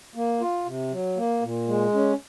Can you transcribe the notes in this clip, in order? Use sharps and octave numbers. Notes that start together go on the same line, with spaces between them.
A#3
F4
C3
F#3
A#3
A#2
G#3
C#4